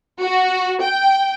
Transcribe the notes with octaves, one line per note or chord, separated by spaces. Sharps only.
F#4
G5